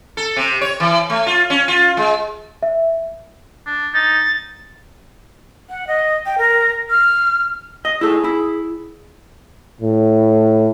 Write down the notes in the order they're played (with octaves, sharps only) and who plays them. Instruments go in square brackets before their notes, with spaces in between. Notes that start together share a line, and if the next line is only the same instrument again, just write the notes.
[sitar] A4
C3
C#5
E3
A3
F4
C#4
F4
G#3
[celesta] E5
[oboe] D4
[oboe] D#4 [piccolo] A6
[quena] F#5
D#5
G5
A#4
F6
[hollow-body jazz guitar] D#5
[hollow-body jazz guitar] E4 A4 [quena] G#4
[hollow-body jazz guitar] E4
[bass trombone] A2